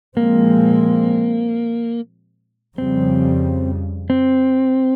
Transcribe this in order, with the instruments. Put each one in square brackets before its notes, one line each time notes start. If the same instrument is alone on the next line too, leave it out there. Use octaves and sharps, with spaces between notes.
[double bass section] A#2 F3 G#3 C4 [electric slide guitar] A#3
[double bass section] F2 C#3 G3 [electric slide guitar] C4
[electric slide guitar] C4